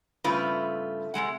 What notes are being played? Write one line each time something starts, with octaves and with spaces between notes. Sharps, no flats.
G2 C#3 A3 C4 F4 B4
C3 E3 G#3 F#5